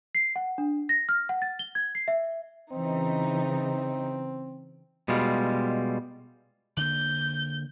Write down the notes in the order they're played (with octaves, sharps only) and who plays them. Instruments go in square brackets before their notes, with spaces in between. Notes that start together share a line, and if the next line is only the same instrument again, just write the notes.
[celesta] C7
F#5
D4
A#6
F6
F#5
A6
G7
G#6
C7
E5
[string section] C#3 E3 D#4 [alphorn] C4
[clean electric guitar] B2 G3 G#3 F4
[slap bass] D3 A#3 [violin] G6